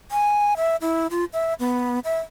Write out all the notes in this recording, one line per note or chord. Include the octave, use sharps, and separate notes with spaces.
G#5
E5
E4
F4
E5
B3
E5